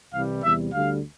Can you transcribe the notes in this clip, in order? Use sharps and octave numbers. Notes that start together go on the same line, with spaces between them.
C2 C3 E3 G3 F5
E2 C3 G3 E5
D2 D3 G3 F5